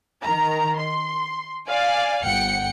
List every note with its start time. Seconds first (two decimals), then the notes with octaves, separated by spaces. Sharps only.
0.23 D#3 A#4 A#5
0.78 C6
1.68 D5 F5 G#5
2.23 G1 F#5 G5 C#7